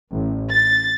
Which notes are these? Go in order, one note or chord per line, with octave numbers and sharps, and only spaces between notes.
A1
A6